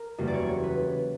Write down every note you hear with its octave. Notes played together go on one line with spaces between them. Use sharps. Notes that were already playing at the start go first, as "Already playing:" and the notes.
Already playing: A#4
F#1 E2 C#3 G3 A#3
D5
C#5
C#5
B4